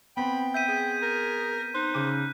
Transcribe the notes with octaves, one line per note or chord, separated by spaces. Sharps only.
B3 C4 G5 B5
E5 G6 B6 D#7
G#4
A#4
D#4 C5 F#6
C#3 D6 D#7